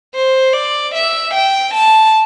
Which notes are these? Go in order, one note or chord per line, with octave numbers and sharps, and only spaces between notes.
C5
D5
E5
G5
A5